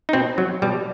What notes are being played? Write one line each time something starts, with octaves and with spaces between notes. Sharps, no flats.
D#4
B2 C4
F#3
B2 G3